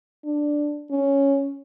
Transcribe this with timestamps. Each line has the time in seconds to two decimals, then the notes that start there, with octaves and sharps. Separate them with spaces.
0.25 D4
0.91 C#4